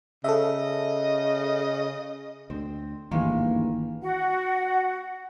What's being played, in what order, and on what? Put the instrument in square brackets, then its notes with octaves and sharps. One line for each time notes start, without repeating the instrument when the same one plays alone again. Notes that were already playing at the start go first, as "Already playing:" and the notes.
[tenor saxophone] C#3 [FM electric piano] A4 E5 [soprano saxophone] D#5
[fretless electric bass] D2 D3 [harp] C4
[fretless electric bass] G#1 D2 G2 [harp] D#3 E3 G#3 [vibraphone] A#3 F5
[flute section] F#4 F#5